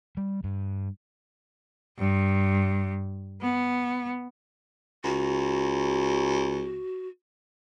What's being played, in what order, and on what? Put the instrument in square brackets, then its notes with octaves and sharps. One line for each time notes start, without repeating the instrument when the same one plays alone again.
[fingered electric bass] G3
G2
[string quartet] G2
B3
[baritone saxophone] C#2 [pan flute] F#4